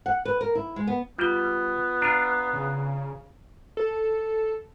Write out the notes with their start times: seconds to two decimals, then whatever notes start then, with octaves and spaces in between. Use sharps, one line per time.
0.06 F#5
0.25 B4
0.41 A#4
0.55 E4
0.76 G#3
0.87 B3
1.18 G3 B3 F4 G7
2.02 D4 F4 A#5 C7
2.53 C#3
3.77 A4